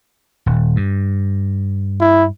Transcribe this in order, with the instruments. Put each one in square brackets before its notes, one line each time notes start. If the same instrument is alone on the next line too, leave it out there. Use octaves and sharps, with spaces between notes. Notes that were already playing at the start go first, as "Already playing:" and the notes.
[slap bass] D#1
G2
[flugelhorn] E4